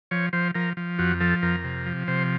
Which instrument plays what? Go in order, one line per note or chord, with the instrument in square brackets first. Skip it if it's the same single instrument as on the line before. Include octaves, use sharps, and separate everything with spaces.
[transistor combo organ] F3 C#5
F3 C5
F3 A#4
F3
F2 F#4
F3 A4
F2 A#4
C3
F3
C3 C5